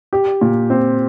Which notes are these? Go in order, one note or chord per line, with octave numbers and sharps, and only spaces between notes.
G4
A#2
C4